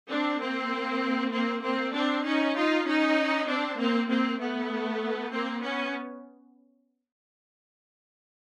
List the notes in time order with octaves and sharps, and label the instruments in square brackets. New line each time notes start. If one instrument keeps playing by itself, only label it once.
[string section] C4 D4
A#3 C4
A#3 C4
A#3 C4
C4 D4
C#4 D#4
D#4 F4
C#4 D#4
C4 D4
A#3 C4
A#3 C4
A3 B3
A#3 C4
B3 C#4